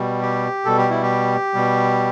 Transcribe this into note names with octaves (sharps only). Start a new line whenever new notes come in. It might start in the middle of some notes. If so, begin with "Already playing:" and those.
Already playing: B2 G3
G4
B2 G3 A4
G4
E4
G4
B2 G3